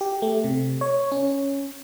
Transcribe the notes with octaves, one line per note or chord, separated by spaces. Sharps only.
G4
A3
C3
C#5
C#4